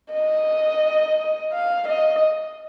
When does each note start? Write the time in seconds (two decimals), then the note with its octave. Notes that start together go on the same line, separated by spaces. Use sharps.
0.14 D#5
1.53 F5
1.88 D#5